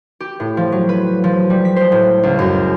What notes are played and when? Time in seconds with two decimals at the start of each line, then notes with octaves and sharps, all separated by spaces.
0.20 G4
0.40 A2
0.57 F3
0.72 F#3
0.89 B4
1.24 F3
1.50 G3
1.65 B6
1.76 C5
1.92 A2
2.23 C#2
2.39 F#2